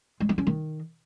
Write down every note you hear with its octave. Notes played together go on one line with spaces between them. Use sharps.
G#3
B3
C#4
D#3